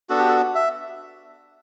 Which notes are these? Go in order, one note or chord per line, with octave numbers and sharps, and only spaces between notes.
B3 D4 F#4 A4
G4
A4
E5